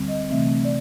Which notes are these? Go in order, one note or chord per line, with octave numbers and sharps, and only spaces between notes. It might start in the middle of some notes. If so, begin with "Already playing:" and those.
Already playing: D2 D3 G3 C4
D#5
C3 E3 A3 C4 E5
D5